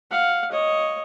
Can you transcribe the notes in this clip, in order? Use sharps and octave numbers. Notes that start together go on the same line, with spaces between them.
F5 F#5
C#5 D#5